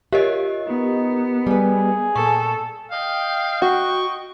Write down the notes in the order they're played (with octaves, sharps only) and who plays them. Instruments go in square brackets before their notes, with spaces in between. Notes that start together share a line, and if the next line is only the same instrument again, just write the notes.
[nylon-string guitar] F4 C#5 E5 [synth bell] G4 A#4 D#5
[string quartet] B3 [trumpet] D#4
[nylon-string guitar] G3 B4 [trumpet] G#4
[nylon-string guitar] A#2 [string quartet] A4 [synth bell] C#6
[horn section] D#5 G5 [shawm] F5
[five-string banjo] F#4 [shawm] C#6